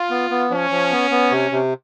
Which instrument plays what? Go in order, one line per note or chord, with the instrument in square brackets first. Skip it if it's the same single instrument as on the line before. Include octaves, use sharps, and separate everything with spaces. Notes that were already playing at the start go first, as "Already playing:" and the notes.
Already playing: [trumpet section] F4
[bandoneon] B3
B3
[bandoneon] F3 [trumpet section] C#4
[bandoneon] F3
B3
B3
C3
C3